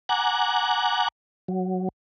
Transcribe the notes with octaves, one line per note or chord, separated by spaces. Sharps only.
F#5 G#5 A#5 D6 F#6
F#3